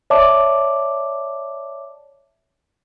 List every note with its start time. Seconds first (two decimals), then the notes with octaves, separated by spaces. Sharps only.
0.10 C#5 D5 E5 A5 D6